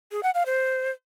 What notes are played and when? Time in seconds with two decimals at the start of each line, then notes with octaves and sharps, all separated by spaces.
0.12 G#4
0.23 F#5
0.35 F5
0.46 C5